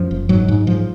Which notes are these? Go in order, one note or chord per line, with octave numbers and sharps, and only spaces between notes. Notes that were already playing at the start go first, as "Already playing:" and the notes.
Already playing: F#2 F3
F#1
G#2 F#3
G#2
G#2 F3